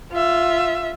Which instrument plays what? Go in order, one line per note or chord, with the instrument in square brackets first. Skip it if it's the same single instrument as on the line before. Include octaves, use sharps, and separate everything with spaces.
[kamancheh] F4 E5